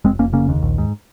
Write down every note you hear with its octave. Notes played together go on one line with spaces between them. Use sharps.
F1 G#3 C4
F1 A#3 C#4
C#3 A#3 C#4
D#2
A#1
G#2